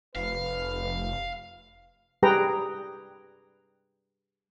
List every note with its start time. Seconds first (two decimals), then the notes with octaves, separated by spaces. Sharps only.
0.16 F1 B4 F5
2.23 G3 G4 G#4 B4 G5 A#5